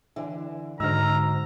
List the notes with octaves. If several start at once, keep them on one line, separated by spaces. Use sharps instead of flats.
D3 E3 E4
G#2 D3 D#4 F#4 C5 A#5 E6 F6